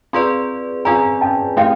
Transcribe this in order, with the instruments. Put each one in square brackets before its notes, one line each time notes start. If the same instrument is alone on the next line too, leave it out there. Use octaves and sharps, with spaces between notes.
[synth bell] C4 F4 G#4 B4 D5 [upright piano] A#5 C6
[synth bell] C4 F4 G#4 B4 D5 [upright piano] G#5 A#5
[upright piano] G5 A5
[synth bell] A3 C4 E4 G4 A#4 [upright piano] F5 G5